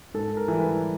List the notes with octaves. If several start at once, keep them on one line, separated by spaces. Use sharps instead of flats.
G#2 A4
A#4
E3 G3
B4